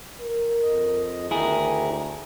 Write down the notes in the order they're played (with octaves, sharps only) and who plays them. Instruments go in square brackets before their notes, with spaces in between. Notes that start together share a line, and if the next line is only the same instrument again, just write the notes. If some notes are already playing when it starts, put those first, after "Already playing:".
[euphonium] A#4
[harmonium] F2 D#5
[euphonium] D2 [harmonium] D#3 A#5 [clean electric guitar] E4 G#4